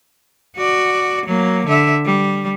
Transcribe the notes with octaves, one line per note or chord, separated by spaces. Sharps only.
F#4 D5
F#3 A#3
D3 E5
G3